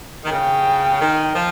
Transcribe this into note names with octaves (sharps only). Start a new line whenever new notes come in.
D#3
C#3 G5
D#3
F3